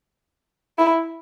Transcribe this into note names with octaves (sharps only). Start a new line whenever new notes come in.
E4